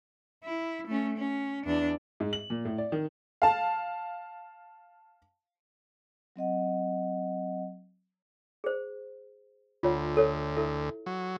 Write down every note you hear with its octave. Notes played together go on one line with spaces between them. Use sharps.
E4
A3 C#4
C#4
E2 D4
G#2
F#7
A#2
A2
D5
D#3
F5 A5
F#3 C4 D#5 F#5
G#4 C5
D2 F4 C#5 F#5
A4 C#5
E4 A4 E5
F#3